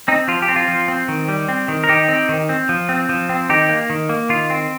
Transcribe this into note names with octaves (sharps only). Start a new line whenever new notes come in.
C4 D#4
F3 F4
G4
C4
F4
F3
C4
D#3
G3
C4
D#3
A#4
D#3 D#4 G4
C4
D#3
C4
F3
C4
F3
C4
D#3 D#4 G4
A#3
D#3
A#3
D#3 F4
C4